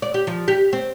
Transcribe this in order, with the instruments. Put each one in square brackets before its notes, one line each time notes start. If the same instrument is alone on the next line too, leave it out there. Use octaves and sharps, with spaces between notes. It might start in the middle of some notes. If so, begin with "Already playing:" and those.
[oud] D5
G4
F3
G4
C4